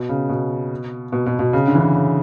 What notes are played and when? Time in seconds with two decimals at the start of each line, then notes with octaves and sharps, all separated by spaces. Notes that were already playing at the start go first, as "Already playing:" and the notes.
Already playing: B2
0.09 C#3
0.29 B2
1.12 B2
1.26 B2
1.39 B2
1.53 C#3
1.67 D3
1.75 E3
1.81 D3
1.95 C#3